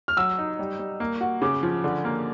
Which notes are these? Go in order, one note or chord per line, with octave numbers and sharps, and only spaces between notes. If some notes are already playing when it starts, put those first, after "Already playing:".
F6
F#3 E6
D#4
G3
G3
A#3
F#4
C#3 D6
F3
D3
A#3